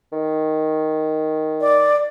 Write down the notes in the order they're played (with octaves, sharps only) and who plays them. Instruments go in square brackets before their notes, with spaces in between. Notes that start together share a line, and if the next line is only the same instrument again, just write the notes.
[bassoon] D#3
[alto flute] D5